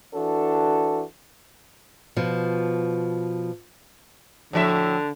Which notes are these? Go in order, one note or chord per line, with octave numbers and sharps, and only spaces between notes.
E3 D4 F#4 A4
B2 F3
A2 D3 F3 E5